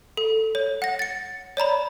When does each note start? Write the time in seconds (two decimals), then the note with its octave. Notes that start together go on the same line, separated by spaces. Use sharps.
0.17 A4
0.55 C#5
0.82 F#5 A#6
0.99 A6 C#7
1.57 C#5 D5 A#5 B5